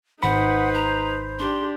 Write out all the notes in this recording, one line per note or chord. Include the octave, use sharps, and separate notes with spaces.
G#1 D#4 B4 C5 F#5 B5
A#5
D4 G4 C6